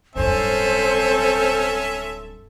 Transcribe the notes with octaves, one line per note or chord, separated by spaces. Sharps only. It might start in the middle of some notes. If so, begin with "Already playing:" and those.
D1 G2 C4 C#4 A4 C5 E5